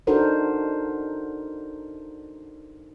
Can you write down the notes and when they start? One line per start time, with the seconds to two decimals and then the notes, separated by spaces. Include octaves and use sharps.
0.07 D4 D#4 F#4 A4 A#4 C5